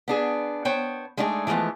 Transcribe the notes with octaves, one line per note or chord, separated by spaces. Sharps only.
B3 D4 G#4
B3 C5 C#5 G5
G#3 A3 D4 D#4 F#4 G#4
E3 F3 G#3 A3 B3